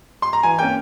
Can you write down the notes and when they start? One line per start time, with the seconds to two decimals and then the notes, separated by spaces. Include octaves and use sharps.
0.22 C6
0.33 A#5
0.43 E3 G#5
0.59 A#3 C#4 G5